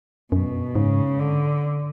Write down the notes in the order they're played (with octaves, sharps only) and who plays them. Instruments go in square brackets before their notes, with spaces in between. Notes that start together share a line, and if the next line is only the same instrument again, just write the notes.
[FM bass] F#2 [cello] B2
[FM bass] G#2 [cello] C#3
[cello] D3